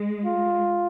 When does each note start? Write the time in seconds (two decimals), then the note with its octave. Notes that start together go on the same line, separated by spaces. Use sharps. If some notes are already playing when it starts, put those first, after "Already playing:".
Already playing: G#3
0.26 F4